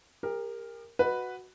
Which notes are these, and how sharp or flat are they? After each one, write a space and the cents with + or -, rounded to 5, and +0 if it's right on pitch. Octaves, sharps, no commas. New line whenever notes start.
G4 +40 A#4 +0
F#4 -5 B4 +0 D#5 +0